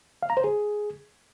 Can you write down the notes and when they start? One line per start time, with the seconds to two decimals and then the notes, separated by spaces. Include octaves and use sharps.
0.23 F5
0.30 A#5
0.37 C5
0.44 G#4